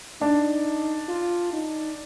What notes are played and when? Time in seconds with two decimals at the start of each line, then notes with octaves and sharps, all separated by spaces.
0.21 D4 D#4
1.09 F4
1.53 D#4